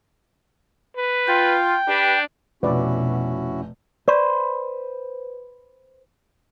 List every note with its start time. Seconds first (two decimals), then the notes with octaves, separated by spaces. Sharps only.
0.96 B4
1.28 F4 G5
1.88 D4 G4 B4
2.63 F1 B2 C#4 E4 F#4 B4 D5
4.08 B4 C5 D5 C#6